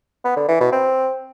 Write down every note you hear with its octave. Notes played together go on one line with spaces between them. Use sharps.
B3
D3
E3
B2
C4